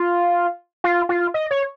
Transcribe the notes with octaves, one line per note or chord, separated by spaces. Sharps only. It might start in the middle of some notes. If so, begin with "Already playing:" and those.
Already playing: F4
F4
F4
D#5
C#5